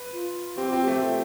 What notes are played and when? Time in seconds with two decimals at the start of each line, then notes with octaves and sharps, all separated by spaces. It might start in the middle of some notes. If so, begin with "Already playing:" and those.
Already playing: B4
0.13 F4
0.57 C4 G4
0.70 C4 F4
0.83 A3 G4
1.02 F4